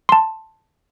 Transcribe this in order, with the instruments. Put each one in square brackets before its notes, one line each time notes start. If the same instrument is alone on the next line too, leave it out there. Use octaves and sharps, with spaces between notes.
[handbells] A5 C6